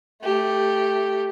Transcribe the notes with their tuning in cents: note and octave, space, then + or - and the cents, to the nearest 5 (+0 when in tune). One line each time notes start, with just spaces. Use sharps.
A3 +0 G4 +0